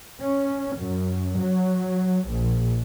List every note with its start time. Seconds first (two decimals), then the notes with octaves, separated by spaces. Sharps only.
0.21 C#4
0.77 F#2
1.39 F#3
2.29 A#1